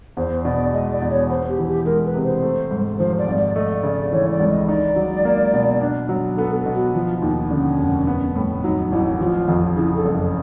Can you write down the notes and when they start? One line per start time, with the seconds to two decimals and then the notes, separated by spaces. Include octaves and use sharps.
0.17 E2 C5
0.45 B2 D5
0.73 G#3 D#5
0.92 D5
1.02 E2
1.10 C#5
1.29 B3 C5
1.49 G4
1.58 E3
1.68 G4
1.86 G#3 A#4
2.06 B4
2.14 C3
2.24 C5
2.42 A3
2.71 G#2
2.99 F3 C5
3.18 D5
3.27 G#1
3.37 D5
3.55 A3 D#5
3.74 D5
3.83 C#3
3.93 D5
4.12 E3 C#5
4.31 D5
4.40 C#2
4.50 D#5
4.68 D#4 D5
4.96 F#3
5.25 A#3
5.53 B2
5.81 D4
6.09 F#3
6.37 B3 A4
6.66 B2
6.75 F#4
6.94 F3 F4
7.22 D#2 D#4
7.50 D3 C#4
7.78 F1
8.07 B3
8.36 A2
8.63 F#3 D#4
8.92 A1 E4
9.20 F3 F#4
9.24 F4
9.48 F2
9.76 C#3 E4
9.95 A4
10.05 F#1